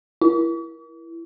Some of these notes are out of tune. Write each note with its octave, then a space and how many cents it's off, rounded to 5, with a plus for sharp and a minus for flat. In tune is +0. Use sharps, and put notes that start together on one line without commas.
E4 +20